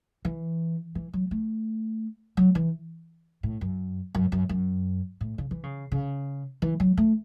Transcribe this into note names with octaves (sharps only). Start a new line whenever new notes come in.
E3
E3
F#3
A3
F#3
E3
A2
F#2
F#2
F#2
F#2
A2
C#3
E3
C#3
C#3
E3
F#3
A3